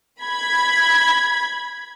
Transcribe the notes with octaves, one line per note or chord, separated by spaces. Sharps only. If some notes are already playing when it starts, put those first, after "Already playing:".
B5 G#6